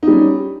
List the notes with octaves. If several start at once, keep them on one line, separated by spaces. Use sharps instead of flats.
G3 C#4 D#4